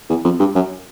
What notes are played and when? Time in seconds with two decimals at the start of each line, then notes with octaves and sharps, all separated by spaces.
0.09 E2
0.24 F2
0.39 G2
0.55 F#2